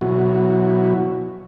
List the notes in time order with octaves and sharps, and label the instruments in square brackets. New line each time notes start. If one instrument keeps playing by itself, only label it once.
[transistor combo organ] B2 F#3 E4 F#4